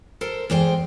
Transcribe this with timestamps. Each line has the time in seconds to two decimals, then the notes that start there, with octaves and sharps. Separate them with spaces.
0.21 A4 A#4 C5
0.50 E2 G#3 C5 G5